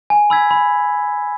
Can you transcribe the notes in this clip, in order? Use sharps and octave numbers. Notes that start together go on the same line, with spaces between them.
G#5
B5 E6 G#6 B6
B5